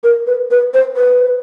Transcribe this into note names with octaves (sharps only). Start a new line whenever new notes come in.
A#4
B4
B4
C5
B4